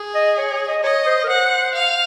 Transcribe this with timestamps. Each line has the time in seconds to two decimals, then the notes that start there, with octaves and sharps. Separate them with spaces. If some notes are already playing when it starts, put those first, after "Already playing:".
Already playing: G#4
0.15 D#5
0.38 C#5
0.53 C#5
0.68 D#5
0.83 C#5 D#5
1.06 C5
1.24 A#4
1.29 C5 F#5
1.75 F5